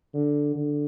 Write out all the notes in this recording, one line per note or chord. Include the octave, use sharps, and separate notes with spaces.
D3
D3